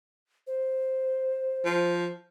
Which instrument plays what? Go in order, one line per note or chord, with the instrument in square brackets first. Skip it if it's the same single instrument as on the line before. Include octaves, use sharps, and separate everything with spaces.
[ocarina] C5
[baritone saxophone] F3